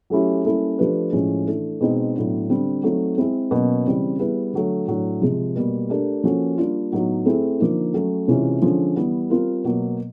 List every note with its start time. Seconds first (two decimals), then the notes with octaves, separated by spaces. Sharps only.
0.10 F#3 A3 C#4 E4 G4
0.45 G3 A#3 C#4 E4 A4
0.79 F3 A3 D4 G4 B4
1.13 A2 F3 G#3 C#4
1.47 E3 A3 D4
1.81 B2 G#3 C4 D#4
2.15 A2 F#3 B3 D4
2.49 D3 G3 C4
2.83 F#3 A3 C4 D#4
3.17 G#3 C4 E4 G#4
3.51 B2 F#3 A#3 C#4
3.85 C#3 E3 G3 C4
4.19 G3 B3 E4 G#4 B4
4.53 D3 F#3 A3
4.87 A2 F#3 A3 D4
5.22 C3 F3 G#3
5.55 B2 G3 A#3
5.89 A3 D4 G4 A#4
6.24 F3 A#3 C#4 F#4 A4
6.58 G3 A#3 D4 F4
6.92 A2 F#3 B3 D#4 F#4
7.26 A3 C4 E4 G#4
7.59 D3 F3 A#3 D#4
7.94 F#3 A3 C#4
8.28 C3 E3 G#3 C#4 F4
8.62 D3 F3 G#3 C#4
8.96 E3 G3 B3
9.30 G3 C4 F4 A#4
9.64 B2 F#3 A#3